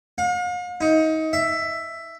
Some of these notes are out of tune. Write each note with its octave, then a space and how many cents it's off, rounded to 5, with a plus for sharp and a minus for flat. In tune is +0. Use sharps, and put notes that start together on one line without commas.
F5 +45
D#4 +25
E5 +10